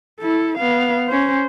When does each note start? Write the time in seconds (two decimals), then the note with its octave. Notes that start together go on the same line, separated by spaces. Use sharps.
0.20 E4 A4
0.58 B3 F5
1.09 C#4 C5